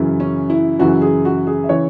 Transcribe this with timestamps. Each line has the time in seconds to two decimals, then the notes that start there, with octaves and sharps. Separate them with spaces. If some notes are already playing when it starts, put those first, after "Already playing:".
Already playing: F#2 C#3 E3
0.20 C#4
0.50 E4
0.79 F#2 C#3 E3 F#4
1.02 G#4
1.25 F#4
1.47 G#4
1.64 E5
1.69 C#3 E3 C#5